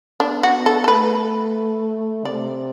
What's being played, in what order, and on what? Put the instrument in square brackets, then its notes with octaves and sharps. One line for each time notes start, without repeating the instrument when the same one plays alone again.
[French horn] B3 [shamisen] D4
[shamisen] F#4
[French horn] B3
[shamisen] A4
A4
[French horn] A3 [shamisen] B4
[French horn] C3 [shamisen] D5